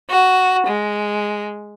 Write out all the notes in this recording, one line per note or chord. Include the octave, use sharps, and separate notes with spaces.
F#4
G#3